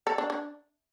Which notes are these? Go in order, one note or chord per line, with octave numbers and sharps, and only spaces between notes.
A4
D4
D4